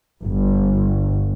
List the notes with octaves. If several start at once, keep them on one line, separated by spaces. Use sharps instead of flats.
G1